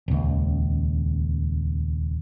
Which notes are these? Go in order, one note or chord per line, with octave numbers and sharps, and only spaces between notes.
D#1 C#2